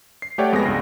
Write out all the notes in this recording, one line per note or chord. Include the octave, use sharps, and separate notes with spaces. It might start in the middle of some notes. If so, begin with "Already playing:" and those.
C7
A3 G4 C#5 D5 F#5 G5
F2 G#3 B3 G#5 A#6
C#2 G2